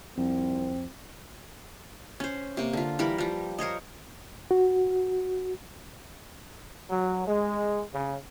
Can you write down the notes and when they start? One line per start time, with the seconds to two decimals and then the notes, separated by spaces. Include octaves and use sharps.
0.17 C2 F2 C4
2.20 C#4 C5
2.57 C3 A#3
2.73 D3 F4
2.99 E3 G3 A#4 B5
3.18 F3 G3
3.58 A#4 C5 C#5 D#5
4.51 F#4
6.90 F#3
7.27 G#3
7.94 C#3